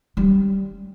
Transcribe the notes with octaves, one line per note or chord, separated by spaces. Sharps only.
G3 C#4